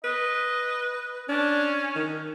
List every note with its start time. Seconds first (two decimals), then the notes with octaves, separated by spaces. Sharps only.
0.05 B4 D#5
1.29 C#4 D4
1.96 D#3